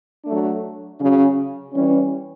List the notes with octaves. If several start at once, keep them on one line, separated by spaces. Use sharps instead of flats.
F#3 A3 D4
C#3 F#3 C#4
E3 G3 C#4